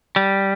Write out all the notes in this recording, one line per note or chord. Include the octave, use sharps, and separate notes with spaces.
G3